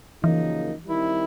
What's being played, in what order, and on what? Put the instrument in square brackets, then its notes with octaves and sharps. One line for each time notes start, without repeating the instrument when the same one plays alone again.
[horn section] F#2 C#3 F3 A#3 D#4 [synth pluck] E3
[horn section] D#3 G3 C4 E4